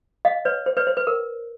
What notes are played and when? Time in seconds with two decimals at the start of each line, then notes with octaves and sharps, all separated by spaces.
0.25 D#5 F5
0.45 B4 C#5
0.66 C5
0.77 B4 C#5
0.87 C5
0.97 B4
1.07 A#4